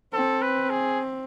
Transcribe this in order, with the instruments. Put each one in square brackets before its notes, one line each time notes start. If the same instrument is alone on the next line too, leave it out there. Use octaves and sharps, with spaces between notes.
[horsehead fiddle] C4 [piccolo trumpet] A4
[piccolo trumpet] B4
G#4